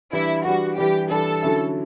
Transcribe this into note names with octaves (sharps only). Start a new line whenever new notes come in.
E3 G3 D4 E4
E3 G3 D4 F#4
E3 G3 D4 G4
E3 G3 D4 A4
D3 F#3 C#4 E4